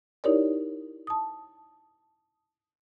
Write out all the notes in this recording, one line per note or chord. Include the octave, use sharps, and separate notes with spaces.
D#4 E4 G4 A#4 C#5 D5
A5 D#6